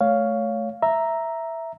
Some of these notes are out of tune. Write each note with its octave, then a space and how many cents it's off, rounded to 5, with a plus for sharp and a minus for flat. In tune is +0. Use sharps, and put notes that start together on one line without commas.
A3 -15 C#5 +15 F5 +0
E5 +0 A#5 +0